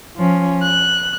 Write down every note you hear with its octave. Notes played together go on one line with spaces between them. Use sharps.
F3 C#4
F#6